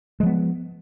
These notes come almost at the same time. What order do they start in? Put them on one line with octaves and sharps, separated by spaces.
G#3 F3 B3